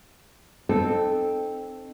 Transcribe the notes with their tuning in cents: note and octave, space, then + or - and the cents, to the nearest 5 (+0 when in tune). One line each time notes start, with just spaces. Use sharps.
C4 +0 D#4 -35 A4 +0